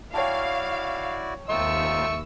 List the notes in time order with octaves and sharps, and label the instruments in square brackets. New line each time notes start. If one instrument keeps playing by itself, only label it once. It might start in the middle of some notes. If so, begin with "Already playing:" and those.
[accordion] E4 F#4 D5 [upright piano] C#5 G5 A5 [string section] F5
[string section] D#2 E6 [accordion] C4 D#4 F4 [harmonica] E5 C#6